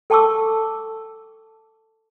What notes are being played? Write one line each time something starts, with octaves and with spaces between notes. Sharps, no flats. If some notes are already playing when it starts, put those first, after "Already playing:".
A4 G5 A5 C#6 D6 E6